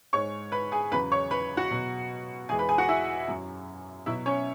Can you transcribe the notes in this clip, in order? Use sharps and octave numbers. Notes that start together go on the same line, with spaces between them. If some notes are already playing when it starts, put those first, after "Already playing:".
G#2 G#3 C#5 C#6
B4 B5
G#4 G#5
E2 C#3 F#3 B4 B5
C#5 C#6
B4 B5
F#4 F#5
B2 F#3
E2 E3 G#3 G#4 G#5
B4 B5
G#4 G#5
F#4 F#5
E4 E5
F#2 F#3
B2 F#3 E4 E5
C#4 C#5